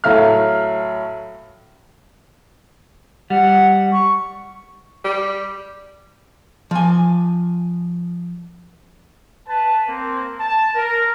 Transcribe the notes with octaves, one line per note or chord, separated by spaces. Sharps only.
A2 F#3 A3 E5 F5 F6
G3 F#5
C#6
G3
F3 G#5
B4 A5
A#3 C4
A5
A#4